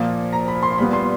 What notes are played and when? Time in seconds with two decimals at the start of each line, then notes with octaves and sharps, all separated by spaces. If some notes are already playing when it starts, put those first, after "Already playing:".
Already playing: A#2 F3 A#3
0.33 A#5
0.48 B5
0.63 C6
0.78 A#2 G3 B3 B5
0.93 C6